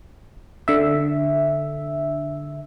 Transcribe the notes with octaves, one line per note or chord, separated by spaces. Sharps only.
D3 E5